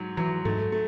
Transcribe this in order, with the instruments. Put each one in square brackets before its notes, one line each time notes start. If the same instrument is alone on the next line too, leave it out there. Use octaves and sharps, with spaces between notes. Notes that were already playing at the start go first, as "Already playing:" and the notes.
Already playing: [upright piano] G#2 F#3
[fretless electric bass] E3 [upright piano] F#3
[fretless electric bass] G#2 [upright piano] A3
[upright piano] A3